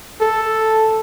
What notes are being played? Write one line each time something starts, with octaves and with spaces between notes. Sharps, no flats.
A4